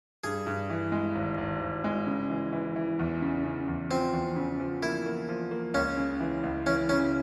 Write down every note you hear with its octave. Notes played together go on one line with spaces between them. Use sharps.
G2 G#4
G2
E3
G#3
G#1
G#1
G#1
G#3
C#3
E3
E3
E3
E2
C#3
C#3
E2
F3 C4
E2
C#3
F3
A#3 E4
A#3
F3
A#3
C#2 C#4
C#3
E3
C#2
E3 C#4
C#3 C#4